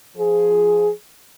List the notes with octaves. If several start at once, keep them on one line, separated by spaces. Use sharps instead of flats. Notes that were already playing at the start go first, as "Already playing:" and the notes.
F3 G#4